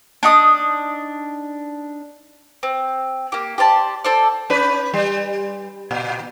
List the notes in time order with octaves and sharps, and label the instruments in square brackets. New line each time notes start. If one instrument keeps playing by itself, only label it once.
[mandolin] D4 D#4 D#6
C4
A#3 G4
G4 C5 D5 A5
A4 C5 D5
[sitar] C#4 B4
G3
A#2